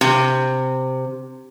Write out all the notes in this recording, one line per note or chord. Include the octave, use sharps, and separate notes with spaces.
C3